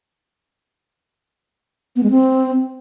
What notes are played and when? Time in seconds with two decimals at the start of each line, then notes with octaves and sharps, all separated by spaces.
1.96 B3
2.03 G#3
2.10 C4